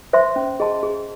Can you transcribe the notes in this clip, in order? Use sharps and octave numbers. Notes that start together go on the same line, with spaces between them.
C5 E5 C6
C#4
G#4 D#5 A5 C6
G#4